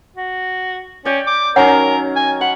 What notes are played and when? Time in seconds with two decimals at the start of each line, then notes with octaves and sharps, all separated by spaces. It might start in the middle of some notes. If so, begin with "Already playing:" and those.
0.17 F#4
1.05 C#4 D5 G5
1.27 D6
1.56 D#3 F#3 C#4 A#4 C#5 F#5
2.16 G#5
2.41 F#5 B5